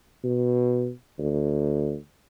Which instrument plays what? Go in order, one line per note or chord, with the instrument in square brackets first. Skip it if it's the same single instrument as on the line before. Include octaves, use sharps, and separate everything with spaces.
[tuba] B2
D2